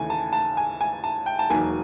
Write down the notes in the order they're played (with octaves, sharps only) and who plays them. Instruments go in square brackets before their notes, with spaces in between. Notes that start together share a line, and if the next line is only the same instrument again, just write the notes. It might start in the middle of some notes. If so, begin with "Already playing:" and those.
Already playing: [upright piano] D#2 C#3 E3 A3 G#5
A5
A5
G#5
G#5
A5
G5
A5
E1 D#2 D#3 F#3 A#3 G#5